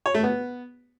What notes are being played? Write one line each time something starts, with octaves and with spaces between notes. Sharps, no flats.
C#5
A3
B3